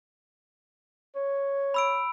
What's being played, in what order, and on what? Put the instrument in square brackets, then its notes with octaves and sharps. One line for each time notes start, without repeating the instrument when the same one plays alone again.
[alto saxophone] C#5
[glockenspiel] B5 E6 D7